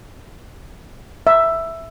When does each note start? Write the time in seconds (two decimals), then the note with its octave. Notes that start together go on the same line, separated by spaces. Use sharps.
1.27 E5